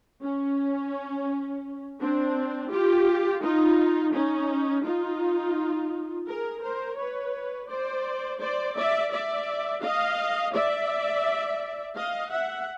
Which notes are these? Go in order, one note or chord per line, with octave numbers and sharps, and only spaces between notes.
C#4
C4 D4
F4 G4
D#4 F4
C#4 D#4
D#4 F4
G#4 A#4
A#4 C5
B4 C#5
C5 D5
C5 D5
D5 E5
D5 E5
D#5 F5
D5 E5
D#5 F5
E5 F#5